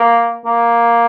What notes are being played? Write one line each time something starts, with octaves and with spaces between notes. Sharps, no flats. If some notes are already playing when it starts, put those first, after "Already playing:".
Already playing: A#3
A#3